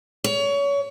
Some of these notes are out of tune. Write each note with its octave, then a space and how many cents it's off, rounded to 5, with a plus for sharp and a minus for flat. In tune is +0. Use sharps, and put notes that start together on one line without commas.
C#5 +25